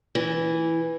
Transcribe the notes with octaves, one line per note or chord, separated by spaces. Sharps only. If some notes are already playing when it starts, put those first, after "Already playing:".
E3